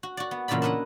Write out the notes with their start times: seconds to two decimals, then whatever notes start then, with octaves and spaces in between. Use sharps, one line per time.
0.03 F#4
0.17 F#4 D5
0.31 B3
0.48 E2 A#2 C#3 E4 D5 B5
0.62 D4 E4 B4 D#5 F#5